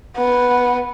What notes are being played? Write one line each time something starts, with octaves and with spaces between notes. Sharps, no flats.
B3